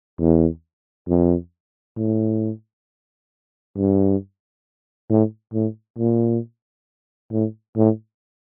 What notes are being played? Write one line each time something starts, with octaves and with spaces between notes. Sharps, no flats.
E2
F2
A2
G2
A2
A2
A#2
A2
A2